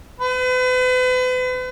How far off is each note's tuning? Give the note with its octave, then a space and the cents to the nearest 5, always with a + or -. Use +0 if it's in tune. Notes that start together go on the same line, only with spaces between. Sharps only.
B4 +40